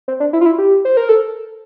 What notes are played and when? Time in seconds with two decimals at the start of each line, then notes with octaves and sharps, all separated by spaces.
0.08 C4
0.20 D4
0.33 E4
0.41 F4
0.46 E4
0.58 G4
0.85 C5
0.97 A#4
1.09 A4